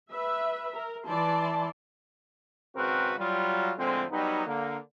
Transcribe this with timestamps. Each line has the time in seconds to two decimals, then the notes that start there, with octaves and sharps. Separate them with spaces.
0.12 B4 E5
0.74 A#4
1.06 E3 E4 D5 A5 C6
2.76 G#1 C#3 C4 F#4 A#4 B4
3.19 F#3 G3 F4
3.78 A2 D3 F3 G#3 C4
4.11 F#3 G3 B3 D#4
4.46 D3 A#3